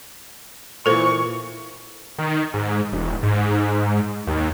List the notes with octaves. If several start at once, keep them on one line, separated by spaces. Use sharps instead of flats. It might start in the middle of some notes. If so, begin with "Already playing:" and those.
A#2 E3 A4 C5 C#6
D#3
G#2
E1
G#2
D#2